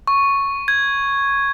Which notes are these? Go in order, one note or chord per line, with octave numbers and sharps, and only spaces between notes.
C#6
G#6